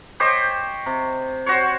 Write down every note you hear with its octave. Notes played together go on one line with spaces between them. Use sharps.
G4 C5 C#5 D#5
C3
F#4 C5 C#5